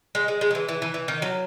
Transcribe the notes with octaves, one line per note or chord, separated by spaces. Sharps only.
G#3
G#3
G#3
F#3
E3
E3
E3
E3
D#3
F#3